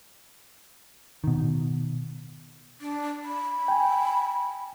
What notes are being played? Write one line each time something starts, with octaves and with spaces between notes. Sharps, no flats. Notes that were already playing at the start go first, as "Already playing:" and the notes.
B2 D#3
D4
B5
G5 G#5